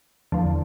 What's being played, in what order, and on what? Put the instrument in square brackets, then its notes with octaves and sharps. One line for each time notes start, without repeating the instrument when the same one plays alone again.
[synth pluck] E2 D3 F3